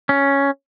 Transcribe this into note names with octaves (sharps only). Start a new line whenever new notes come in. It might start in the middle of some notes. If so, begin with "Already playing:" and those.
C#4